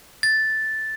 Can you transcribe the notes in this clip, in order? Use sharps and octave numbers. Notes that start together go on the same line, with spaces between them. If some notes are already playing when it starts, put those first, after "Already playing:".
A6